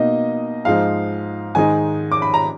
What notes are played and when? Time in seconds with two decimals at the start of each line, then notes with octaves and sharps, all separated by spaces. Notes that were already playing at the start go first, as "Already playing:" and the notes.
Already playing: B2 A#3 D#4 D#5
0.65 G#2 F3 G#3 D#4 F5
1.55 G#2 D#3 G#3 D#4 G#5
2.12 D6
2.22 B5
2.34 A#5